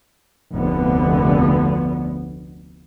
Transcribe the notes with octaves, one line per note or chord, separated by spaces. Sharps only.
F1 D2 D3 B3